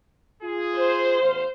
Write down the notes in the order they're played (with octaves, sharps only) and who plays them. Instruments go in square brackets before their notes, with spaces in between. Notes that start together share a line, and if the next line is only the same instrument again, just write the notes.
[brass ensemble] F4 G#4
[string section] C5
[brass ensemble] A1 E2 F5